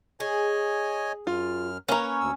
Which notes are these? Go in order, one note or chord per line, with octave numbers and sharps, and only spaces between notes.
G#4 C#5 D#5 G#5
F#2 F4 F6
A#3 C#4 B4 C#5 A#5
D2 E6